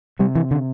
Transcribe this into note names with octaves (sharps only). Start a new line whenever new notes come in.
C3 G3
E3
D3